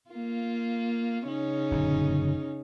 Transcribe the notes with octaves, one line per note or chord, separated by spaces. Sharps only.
A#3 F4
C#3 C#4 D#4
F#1 A#2 D3